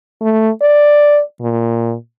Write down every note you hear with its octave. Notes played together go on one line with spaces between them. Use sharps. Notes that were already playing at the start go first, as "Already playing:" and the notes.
A3
D5
A#2